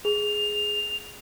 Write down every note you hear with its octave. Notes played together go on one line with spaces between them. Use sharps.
G#4 F7